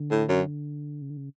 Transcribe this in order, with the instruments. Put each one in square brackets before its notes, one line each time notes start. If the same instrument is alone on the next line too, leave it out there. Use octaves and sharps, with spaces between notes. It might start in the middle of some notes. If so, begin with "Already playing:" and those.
Already playing: [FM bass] D3
[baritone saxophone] A2
F#2
[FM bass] C#3
D3
C#3